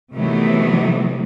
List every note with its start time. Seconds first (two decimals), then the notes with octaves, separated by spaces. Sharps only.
0.13 C3 D#3 E3 F#3 A3 B3